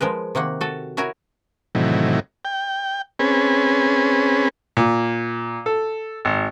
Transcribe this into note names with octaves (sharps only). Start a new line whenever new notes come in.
F3 G#3 A#4 B4
C3 D#3 A#3 F#5
F#4 A4
E4 F#4 A#4 C#5 G#5 A#5
A2 C3 D#3 E3 F#3
G5
C4 C#4 G#4 B4
A#2
A4
G#1